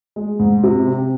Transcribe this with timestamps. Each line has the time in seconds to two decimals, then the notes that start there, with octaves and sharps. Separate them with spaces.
0.16 G#3
0.39 G#2
0.63 C3
0.87 C4